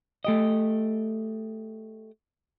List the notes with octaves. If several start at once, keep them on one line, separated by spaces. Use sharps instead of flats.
A3 G4 D#5